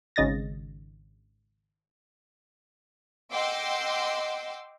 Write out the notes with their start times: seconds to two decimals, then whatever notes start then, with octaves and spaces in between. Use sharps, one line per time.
0.16 G#1 C#3 D#5 A6 A#6
3.32 D#5 F#5 G5 C6 D6 E6